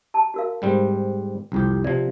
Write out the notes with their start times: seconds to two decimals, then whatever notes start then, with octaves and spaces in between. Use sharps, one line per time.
0.14 A5 A#5
0.34 F#4 A#4 F5
0.62 G#2 G3 C4
1.52 C2 F2 G4
1.84 C3 F3 D5